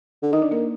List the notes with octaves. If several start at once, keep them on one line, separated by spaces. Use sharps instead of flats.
D3
D#3 D#4 D#5
D4 D5
A#3 A#4